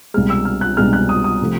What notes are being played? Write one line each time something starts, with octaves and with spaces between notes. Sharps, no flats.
C2 B2 G#3 F6
E6
F6
F#6
C2 B2 G#3 F6
F#6
D#6
D#6
C3 F3 A3